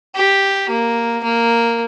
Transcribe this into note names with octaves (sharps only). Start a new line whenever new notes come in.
G4
A#3
A#3